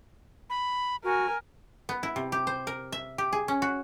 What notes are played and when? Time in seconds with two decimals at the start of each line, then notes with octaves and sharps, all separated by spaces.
0.50 B5
1.04 F#4 A#4 G#5
1.89 B3
2.03 E4
2.16 C3
2.32 G4
2.47 C5
2.67 A#4
2.92 E5
3.18 G4
3.33 G#4
3.48 C#4
3.62 F#4